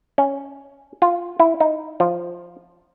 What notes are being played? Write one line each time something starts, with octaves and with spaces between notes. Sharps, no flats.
C#4
F4
E4
D#4
F3